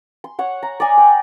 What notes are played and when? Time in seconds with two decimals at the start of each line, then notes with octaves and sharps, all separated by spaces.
0.24 C6
0.39 C#5 F#5
0.63 A#5
0.80 D5 D#5 G#5
0.98 G5